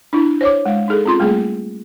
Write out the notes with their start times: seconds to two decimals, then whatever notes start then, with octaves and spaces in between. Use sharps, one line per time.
0.13 D4 E4
0.41 C5 C#5 D6
0.66 G#3 F5
0.88 D#4 G#4 A4
1.05 C4 C#4 F4 C6
1.20 G3 A3 A#3 G#4